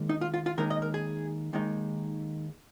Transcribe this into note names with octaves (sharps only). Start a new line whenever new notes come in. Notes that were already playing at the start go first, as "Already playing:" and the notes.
Already playing: D#2 D#3 G#3
D#4
F4
F4
F4
D#2 D#3 G#3 D#4 A#4
D#5
A#4
G#4
D#2 D#3 G#3 D#4